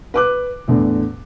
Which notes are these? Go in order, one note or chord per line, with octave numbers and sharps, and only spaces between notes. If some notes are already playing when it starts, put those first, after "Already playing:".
B4 D6 F#6
E2 A2 D3